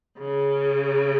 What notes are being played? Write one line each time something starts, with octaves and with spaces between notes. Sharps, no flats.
C#3